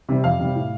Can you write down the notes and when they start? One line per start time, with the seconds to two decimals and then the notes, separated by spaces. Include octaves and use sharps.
0.09 C3 G3
0.24 F2 F5
0.39 C3 G3
0.55 A2